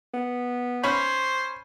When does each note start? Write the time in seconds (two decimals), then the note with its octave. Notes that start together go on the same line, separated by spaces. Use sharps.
0.14 B3
0.84 C#4 C5 C#5 B5